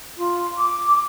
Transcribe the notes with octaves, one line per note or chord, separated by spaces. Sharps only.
F4
D6